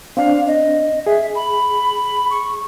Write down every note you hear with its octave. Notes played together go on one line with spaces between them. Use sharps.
C4 D4 F5
D#5
G#4 E5
B5
C#6